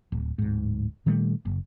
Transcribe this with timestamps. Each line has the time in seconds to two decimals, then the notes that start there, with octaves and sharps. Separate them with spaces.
0.12 D1
0.38 D1 G#2
1.06 A#2 D#3 G3 A3
1.45 F#1